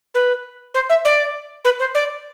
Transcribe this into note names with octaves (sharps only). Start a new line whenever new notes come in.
B4
C5
E5
D5
B4
C5
D5